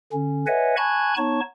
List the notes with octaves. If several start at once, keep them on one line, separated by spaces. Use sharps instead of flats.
D3 C#4
B4 C#5 D#5 E5 F#5 G#5
G#5 A5 B5 C#6 F#6 G#6
B3 D#4 C#5 A5 C#6